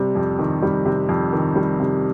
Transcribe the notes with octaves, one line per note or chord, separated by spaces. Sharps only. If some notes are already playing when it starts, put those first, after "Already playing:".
Already playing: C3 G3
F2
D#3
G3
C3
F2
D#3
G3
C3